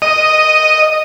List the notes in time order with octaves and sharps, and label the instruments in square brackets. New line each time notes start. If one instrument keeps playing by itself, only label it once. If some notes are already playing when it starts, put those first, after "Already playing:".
[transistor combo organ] D#5